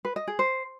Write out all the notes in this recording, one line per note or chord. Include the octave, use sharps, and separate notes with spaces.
B4
D#5
G#4
C5